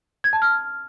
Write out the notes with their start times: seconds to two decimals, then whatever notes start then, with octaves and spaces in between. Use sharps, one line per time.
0.24 G#6
0.33 A5
0.42 F6